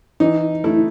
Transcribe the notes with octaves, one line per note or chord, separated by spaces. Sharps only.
E3 D#4
A3 E4